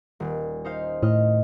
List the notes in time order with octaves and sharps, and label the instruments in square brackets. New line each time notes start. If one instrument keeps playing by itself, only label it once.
[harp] D#1
D#4 C5 F5
[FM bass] A2 [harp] D#5 F6